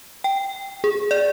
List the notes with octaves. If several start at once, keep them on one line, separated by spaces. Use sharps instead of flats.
G5
G#4
D5